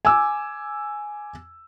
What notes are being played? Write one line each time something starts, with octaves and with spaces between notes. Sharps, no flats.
G#5 D6 E6